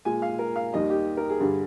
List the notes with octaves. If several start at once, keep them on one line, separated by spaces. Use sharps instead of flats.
A#2 G#3 G#5
F5
A#4
F5
D#2 D#3 G3 D#5
G4
A#4
G#4
G2 D3 G3